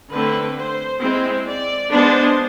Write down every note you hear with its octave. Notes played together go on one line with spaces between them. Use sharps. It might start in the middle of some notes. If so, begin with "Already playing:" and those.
D3 A3 C4 B4
C5
G#3 C4 E4
D5
G#3 B3 D4 C5